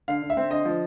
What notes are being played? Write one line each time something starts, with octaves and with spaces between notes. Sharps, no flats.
D3 F5
D3
E5
C4
D3 D#5
F3